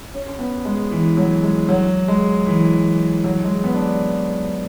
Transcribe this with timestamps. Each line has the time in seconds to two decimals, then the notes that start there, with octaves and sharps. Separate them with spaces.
0.14 C#4
0.39 B3
0.65 G#3
0.91 E3
1.17 F#3
1.43 G#3
1.69 F#3
2.08 G#3
2.47 E3
3.24 F#3
3.44 G#3
3.64 B3
3.74 D4